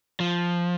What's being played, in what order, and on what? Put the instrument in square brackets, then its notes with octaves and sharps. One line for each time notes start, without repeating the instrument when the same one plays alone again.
[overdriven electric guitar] F3